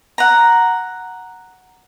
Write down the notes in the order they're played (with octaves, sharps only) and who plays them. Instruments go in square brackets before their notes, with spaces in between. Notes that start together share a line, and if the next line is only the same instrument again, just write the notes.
[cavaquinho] F#5 A#5